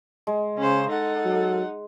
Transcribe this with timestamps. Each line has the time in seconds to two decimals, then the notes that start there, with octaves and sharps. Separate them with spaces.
0.27 G#3
0.58 C#3 C#4 C5
0.89 D#4 A4 F#5
1.25 F#3